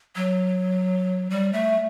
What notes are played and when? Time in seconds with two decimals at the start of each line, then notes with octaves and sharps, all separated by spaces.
0.16 F#3
1.30 G3
1.53 A3